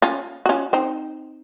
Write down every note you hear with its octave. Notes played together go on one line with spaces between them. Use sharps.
C#4 F4
F#4
C#4 F4
C4 D#4